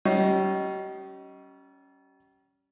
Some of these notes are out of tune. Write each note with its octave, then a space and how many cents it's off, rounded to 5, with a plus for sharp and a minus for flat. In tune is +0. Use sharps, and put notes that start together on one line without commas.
G3 -40 C#4 +0 D#5 +0